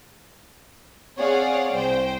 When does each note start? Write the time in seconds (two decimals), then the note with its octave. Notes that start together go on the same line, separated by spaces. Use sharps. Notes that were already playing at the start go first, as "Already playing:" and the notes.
1.18 C4 G#4 C#5 D5 F5 F#5
1.76 C2 C5 G5